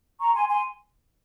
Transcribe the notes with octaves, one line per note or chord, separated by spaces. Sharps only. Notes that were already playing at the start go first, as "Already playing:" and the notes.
A#5 C#6
G#5 C6
G#5 C6